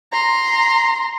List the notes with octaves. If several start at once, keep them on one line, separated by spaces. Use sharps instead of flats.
A#5 C6